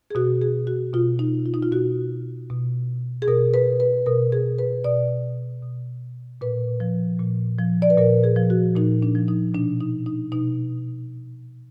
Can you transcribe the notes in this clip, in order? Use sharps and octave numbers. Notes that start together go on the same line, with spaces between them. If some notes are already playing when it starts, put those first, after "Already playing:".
G#4
B2 F#4
G#4
F#4
B2 F4
D#4
F4
D#4
F4
B2 F#4
B2
G#4
B2 A#4
B4
B4
B2 A#4
G#4
B4
B2 D5
B2
A#2 B4
F3
A#2
F3
D5
B4
A#2 A#4
G#4
F3
F#4
A#2 D#4
D4
F3
D#4
B2 D4
D#4
D#4
B2 D#4